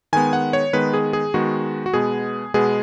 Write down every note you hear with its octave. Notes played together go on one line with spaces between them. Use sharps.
D#3 G#3 B3 G#5
F#5
C#5
D#3 G#3 B3 B4
G#4
G#4
D#3 G#3 B3 F#4
F#4
B2 G#3 B3 G#4
B2 G#3 B3 G#4